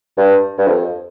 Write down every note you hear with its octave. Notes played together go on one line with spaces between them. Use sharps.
G2
G2
F2